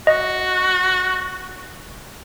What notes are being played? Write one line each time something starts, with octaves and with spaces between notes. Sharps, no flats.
F#4 D#5